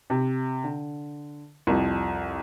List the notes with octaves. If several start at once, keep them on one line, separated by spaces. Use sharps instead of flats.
C3
D3
C2 F2